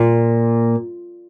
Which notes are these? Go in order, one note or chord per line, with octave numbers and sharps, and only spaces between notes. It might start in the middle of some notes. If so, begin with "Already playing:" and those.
Already playing: A#2